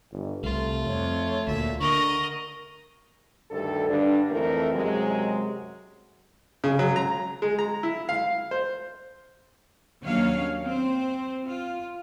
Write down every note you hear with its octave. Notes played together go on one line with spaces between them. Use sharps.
G1
C2 A3 F4
F2 C#5
D2 A#2 E5
D3 A#4 D#5 C#6
D2 G2 D#3 A4
G2 D3 D4
F2 E3 A3 C4 A#4
F#2 C3 F#3 G#3
C#3
F#3
A#5
G#3
A#5
E4
F5
C5
D#2 F#3 C#4 D4 C#5 F5
C4 C5
F4